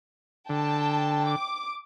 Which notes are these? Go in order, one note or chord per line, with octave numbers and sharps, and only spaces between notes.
D3 G5 A5
D6